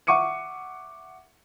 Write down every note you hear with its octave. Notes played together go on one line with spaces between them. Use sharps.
E5 F#5 C#6 D6 C#7 D#7